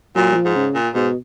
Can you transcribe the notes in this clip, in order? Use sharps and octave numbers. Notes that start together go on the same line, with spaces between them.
A#2 F#3
F#3
F3
G#2
C#3
A#2
G#2 B2